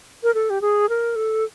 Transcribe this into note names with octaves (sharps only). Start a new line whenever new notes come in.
A#4
A4
G4
G#4
A#4
A4